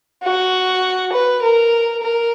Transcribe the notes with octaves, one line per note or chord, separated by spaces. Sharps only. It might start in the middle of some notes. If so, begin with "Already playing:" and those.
F#4
B4
A#4
A#4